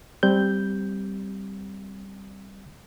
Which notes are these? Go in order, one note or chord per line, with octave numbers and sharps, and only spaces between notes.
G3 C4 G6